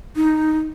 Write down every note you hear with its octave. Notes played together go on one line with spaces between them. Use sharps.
D#4